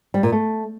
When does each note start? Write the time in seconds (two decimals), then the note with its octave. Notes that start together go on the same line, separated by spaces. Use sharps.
0.14 G3
0.23 A#2
0.32 A3